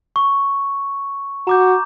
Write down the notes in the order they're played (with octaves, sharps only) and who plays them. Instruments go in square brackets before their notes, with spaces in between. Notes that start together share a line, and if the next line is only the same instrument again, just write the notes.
[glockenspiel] C#6
[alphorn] F#4 [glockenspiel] A#5 D6 G6